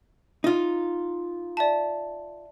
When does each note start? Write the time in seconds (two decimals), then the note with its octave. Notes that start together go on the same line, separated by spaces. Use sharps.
0.44 D#4 F4
1.57 D5 E5 A5